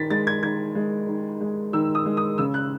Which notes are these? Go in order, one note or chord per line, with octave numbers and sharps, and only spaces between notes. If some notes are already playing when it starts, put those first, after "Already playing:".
Already playing: D#3 A6 B6
G#3 A6
G#6
D#3 G#6
G#3
D#3
G#3
D#3 E6
D#6
G#3
D#6
C#3 E6
F#6